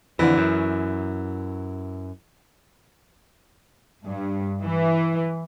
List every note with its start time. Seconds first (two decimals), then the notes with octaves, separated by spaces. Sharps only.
0.19 F2 D3 E3
0.37 F#2
4.06 G2
4.65 E3